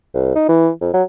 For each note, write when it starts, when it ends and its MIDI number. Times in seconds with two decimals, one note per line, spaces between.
0.14 0.35 36
0.35 0.46 63
0.48 0.70 52
0.81 0.93 41
0.94 1.03 54